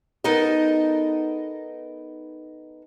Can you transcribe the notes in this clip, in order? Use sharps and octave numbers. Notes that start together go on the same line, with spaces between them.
B3 D#4 A4 A#4 D#5